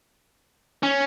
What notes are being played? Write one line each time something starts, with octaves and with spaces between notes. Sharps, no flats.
C#4